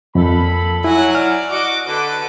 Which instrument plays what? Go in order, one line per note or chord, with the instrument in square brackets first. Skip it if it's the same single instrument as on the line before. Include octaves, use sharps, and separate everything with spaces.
[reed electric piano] F2 [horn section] A#2 A4 B5
[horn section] F#3 [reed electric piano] E4 [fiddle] F#5 G#5
[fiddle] D5 [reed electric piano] F6
[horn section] F#4 [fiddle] D#5 D6
[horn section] D3 B4 [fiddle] A4 D6